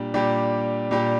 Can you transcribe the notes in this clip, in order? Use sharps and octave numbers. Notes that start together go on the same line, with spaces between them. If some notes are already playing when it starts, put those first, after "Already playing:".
Already playing: A#2 G3 D4 G4
A#2 G3 D4 G4
A#2 G3 D4 G4